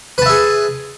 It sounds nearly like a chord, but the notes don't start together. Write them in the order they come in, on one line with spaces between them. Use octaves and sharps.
B4 A5 E5 G#4